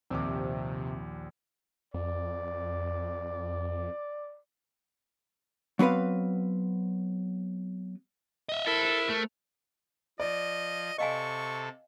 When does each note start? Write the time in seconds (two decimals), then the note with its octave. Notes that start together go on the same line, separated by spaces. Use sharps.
0.10 A#1 D#2 C3 D6
1.94 F2 D5
5.79 F#3 B3 C4 B4 F5
8.49 D#5 E5
8.67 E4 A4 A#4 C5
9.10 A3
10.20 F3 D5 D#5
10.98 C3 A4 D#5 F5 G#5 C#6